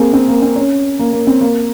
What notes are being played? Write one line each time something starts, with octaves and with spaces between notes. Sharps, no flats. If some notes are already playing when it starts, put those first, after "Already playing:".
Already playing: A#3 C4 G#4
C4
A#3
C4
C#4
A#3
A#3
C4
A#3